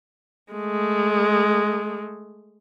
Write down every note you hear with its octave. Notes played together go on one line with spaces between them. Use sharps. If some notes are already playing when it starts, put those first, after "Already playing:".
G#3 A3